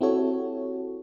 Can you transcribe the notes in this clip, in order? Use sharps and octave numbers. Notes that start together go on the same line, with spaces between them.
C4 E4 F#4 G4 A4 C#5